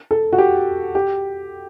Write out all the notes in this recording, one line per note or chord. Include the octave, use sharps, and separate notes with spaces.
A4
F#4
G4
G4